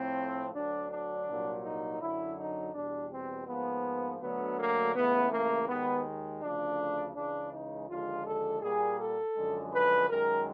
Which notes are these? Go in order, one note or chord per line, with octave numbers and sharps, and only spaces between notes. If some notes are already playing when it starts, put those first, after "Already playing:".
Already playing: A2 F3 A3 C4
D2 D3 F#3 D4
D4
C2 A#2 F#3
D#4
F#2 D3 F#3 E4
D#4
E2 B2 G3 D4
C4
G#2 F3 A#3 B3
D2 D3 F#3 A3 B3
A#3
C#2 C#3 E3 A3 B3
A#3
D#2 D#3 G#3 B3
D2 C#3 F3 A3 D4
C#2 C#3 E3 G#3 D4
D#4
D#2 D3 F3 G#3 F4
A4
A#2 G3 A#3 G#4
A4
F#2 D3 F3 G#3
B4
F#2 D#3 G#3 A#4